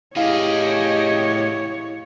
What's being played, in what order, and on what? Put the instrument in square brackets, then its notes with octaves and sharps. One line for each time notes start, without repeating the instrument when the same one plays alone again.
[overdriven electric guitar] A2 G#4 [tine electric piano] E4 F5 [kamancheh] G4 D#5 [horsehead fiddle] C#5